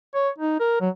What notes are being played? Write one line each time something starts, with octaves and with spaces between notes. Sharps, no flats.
C#5
D#4
A#4
F#3